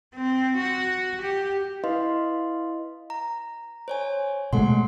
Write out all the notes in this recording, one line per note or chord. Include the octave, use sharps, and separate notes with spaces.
C4
F#4
G4
E4 B4 D#5 F5 C6
A#5
C5 C#5 G#5
B2 G#3 A3 A4 F#5 C6